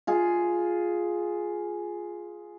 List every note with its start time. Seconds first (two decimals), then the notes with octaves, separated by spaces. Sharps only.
0.07 F4 G#4